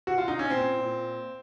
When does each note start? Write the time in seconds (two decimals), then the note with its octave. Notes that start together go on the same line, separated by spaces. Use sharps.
0.07 F#4
0.18 F4
0.28 D#4
0.39 C#4
0.50 A#2 C4
0.78 A#2